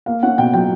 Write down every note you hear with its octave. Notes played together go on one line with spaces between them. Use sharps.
A#3 F5
C#4 F#5
B2 G5
F#3 G5